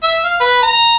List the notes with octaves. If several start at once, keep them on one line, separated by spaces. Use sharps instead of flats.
E5
F5
B4
A#5